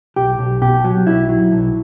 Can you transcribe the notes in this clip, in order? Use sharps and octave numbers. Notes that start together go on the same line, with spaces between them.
B1 G4
B1
B2 G4
F#3
B1 E4
F#3
B1